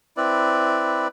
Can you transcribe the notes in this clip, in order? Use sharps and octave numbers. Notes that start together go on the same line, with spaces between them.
C4 E4 B4 D5